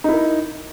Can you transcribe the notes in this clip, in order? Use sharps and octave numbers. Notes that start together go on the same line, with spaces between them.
D#4 E4 A#4